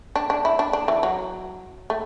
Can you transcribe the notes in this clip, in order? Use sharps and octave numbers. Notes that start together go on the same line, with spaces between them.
D4
D4
E4
D4
D4
E3
F#3
A3